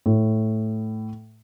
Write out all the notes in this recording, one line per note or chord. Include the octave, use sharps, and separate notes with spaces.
A2